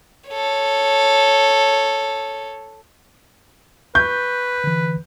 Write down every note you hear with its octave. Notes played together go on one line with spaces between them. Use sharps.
A4 C#5
B4 C#6 G6
D3 E3